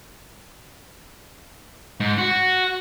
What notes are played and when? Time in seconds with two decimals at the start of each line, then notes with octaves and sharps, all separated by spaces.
2.00 G#2
2.18 F#4